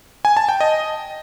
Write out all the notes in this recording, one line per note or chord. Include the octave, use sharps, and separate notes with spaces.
G#5
A5
G5
D#5